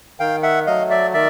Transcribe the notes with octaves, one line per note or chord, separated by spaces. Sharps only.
D#3 F5 G5
E5 F#5
F#3 A3 D#5 F5
D5 E5
D#3 D5 E5